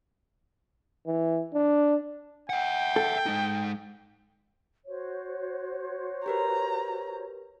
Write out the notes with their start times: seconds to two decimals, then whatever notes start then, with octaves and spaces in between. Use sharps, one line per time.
1.06 E3
1.54 D4
2.50 E5 F#5 G5
2.96 A4
3.26 G#3 D#4
4.86 F#4 C5 C#5
6.26 G4 A#4 B4 A#5